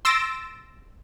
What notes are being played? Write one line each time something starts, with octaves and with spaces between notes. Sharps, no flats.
C6 E6 A6 A#6 D7 E7